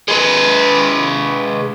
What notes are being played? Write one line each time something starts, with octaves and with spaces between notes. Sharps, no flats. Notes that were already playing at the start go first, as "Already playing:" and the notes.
G#3 B4